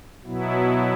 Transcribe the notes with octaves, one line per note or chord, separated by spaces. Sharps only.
B2 F#3 B3 E4